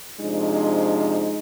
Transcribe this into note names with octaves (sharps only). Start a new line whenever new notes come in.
C3 F3 G#3 D4 D#4